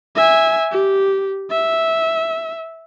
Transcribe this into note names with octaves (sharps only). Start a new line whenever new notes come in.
E5 G#5
G4
E5